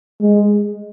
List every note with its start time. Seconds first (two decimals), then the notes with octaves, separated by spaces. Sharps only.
0.21 G#3